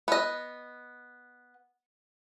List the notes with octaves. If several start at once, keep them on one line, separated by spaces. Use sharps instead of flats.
B3 D#5